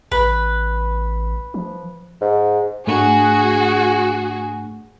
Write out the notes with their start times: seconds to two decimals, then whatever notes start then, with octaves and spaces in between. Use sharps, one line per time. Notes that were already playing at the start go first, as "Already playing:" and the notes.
0.12 A1 B4
1.54 F3
2.21 G#2
2.87 G#2 A3 D4 F#4 G#4